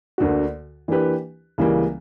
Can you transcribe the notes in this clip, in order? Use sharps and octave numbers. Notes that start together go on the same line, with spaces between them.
D2 D3 A#3 D4 F#4
E3 A#3 D4 G4 B4
C#2 C#3 E3 G3 A#3